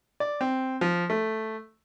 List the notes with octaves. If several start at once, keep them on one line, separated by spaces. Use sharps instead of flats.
D5
C4
F3
A3